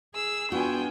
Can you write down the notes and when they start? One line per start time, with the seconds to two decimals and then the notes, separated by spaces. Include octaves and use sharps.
0.15 G#4 E6
0.52 B3 D4 F4 F#4 G5 G#5